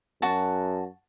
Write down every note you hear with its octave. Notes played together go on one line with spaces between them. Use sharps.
F#2 F#4 A5